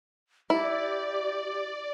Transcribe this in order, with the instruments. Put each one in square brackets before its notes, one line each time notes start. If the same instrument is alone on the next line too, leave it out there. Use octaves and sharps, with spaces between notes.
[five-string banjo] E4 [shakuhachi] G4 [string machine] D5